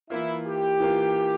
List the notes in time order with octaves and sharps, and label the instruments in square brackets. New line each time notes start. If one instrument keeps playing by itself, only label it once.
[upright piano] E3 A#3 F4 [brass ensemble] E4
[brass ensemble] G4
[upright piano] E3 A#3 F4